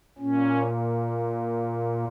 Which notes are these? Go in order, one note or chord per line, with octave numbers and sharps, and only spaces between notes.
A#2 C#4